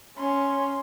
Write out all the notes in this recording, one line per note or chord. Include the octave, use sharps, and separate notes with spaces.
C#4 C6